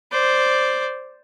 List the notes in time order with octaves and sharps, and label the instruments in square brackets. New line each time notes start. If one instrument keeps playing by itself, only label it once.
[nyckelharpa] C5 D5